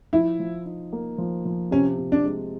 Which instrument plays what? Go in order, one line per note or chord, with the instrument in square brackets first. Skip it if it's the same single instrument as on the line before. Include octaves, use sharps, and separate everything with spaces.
[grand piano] F3 [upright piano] E4
[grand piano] F3
D#4
A#3
F3
F3
[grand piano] C3 [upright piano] C#4
[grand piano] C3
[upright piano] D4
[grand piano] G#3